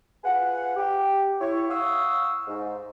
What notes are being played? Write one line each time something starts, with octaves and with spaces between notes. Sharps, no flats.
F4 G#4 B4 F#5
G4
E4 C#5
F5 F#5 C#6 D#6 E6
G#2